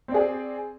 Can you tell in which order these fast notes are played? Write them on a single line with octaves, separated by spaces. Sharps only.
C4 D5 G#4